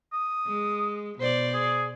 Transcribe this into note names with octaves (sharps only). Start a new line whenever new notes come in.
D#6
G#3
B2 C5 D5
G#4